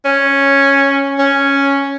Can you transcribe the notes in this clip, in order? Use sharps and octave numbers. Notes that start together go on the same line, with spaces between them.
C#4
C#4